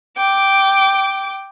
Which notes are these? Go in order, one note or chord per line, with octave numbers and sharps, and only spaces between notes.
G5 D6